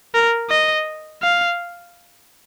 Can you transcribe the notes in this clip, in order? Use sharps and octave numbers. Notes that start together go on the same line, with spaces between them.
A#4
D#5
F5